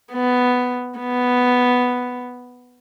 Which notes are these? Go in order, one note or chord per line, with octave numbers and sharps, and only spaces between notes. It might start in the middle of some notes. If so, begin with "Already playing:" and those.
B3
B3